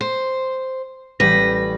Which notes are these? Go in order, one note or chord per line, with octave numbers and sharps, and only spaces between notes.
C5
A1 G3 B4 G6 A#6